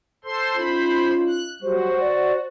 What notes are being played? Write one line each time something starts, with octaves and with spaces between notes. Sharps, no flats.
A4 C5 C6
C#4 D#4 F4 C5 B5
F#6
F#3 G3 F#4 C5
C5 D5